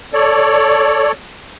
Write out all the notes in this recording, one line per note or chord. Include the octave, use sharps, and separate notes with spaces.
A4 C#5 D5